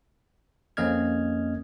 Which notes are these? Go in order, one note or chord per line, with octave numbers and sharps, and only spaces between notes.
F2 A#3 C#4 D#5 F6 G#6